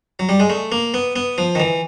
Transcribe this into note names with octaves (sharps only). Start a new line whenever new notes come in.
F#3
G3
G#3
A3
A#3
B3
B3
F3
D#3
E3